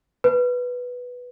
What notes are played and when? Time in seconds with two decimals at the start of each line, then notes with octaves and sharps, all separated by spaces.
0.24 B4